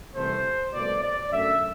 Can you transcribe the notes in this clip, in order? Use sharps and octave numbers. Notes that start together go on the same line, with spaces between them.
C2 C3 E3 A3 C5
C2 B2 A3 D5
D5
F#2 D3 A3 E5